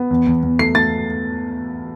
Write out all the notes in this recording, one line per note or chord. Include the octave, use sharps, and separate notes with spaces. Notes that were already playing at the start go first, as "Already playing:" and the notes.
Already playing: B3
E2
E2
E2
A3 C7
A3 A6